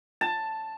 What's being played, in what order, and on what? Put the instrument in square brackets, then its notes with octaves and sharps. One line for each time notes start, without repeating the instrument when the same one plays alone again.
[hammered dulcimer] A5